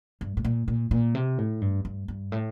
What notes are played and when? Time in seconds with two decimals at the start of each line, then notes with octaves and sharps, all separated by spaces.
0.21 G2
0.37 A2
0.45 A#2
0.68 A#2
0.91 A#2
1.15 C3
1.38 A2
1.62 G2
1.85 G2
2.08 G2
2.32 A2